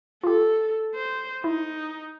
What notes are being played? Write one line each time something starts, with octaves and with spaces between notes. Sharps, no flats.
F4 G4 A4
C5
D#4 E4